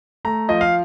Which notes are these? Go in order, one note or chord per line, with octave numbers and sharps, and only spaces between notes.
A3 A#5
F3 D#5
F5